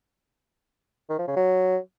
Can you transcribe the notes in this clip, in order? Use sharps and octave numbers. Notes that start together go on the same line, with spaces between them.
D#3
F3
C#3
F#3